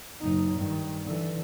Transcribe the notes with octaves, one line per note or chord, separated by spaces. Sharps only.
F#1 D#4
G2 D#3
D3 E3